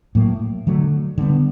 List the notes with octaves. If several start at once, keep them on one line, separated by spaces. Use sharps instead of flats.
A2 F#3 A#3
D3 F#3 A3
D3 G3 B3